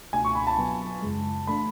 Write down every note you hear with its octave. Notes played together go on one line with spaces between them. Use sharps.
C#2 B2 A3 D4 F#4 G#5
C#6
B5
A5
B2 F#3 B3 F#4 B4
F#2 C#3 G#3
E3 A3 D4 B5